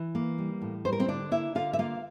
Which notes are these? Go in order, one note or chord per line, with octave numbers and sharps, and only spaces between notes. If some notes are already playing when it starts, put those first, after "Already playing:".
Already playing: E3
A#3
G3
A2
G3 C5
A#4
C4 C5
D3 D4 D5
A#3 E4 E5
D3 F4 F5
E5
A#3 F4 F5